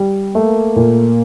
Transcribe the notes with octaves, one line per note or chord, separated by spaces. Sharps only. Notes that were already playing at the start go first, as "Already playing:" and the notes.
Already playing: G3
A3 A#3
A#2